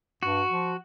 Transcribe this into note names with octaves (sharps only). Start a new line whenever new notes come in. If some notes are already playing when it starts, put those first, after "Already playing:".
G2 F#4
F3